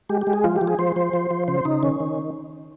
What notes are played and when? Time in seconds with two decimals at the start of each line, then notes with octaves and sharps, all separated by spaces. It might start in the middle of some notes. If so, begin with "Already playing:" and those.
0.09 G#3 G4
0.21 G4
0.27 G#3
0.33 G#4
0.44 F3 F4
0.56 G4
0.61 F3
0.67 G#4
0.79 F3 C5
0.96 F3 C5
1.13 F3
1.31 F3
1.48 C#3 C5
1.65 C#3 D#4
1.83 D#3 C#4
2.00 D#3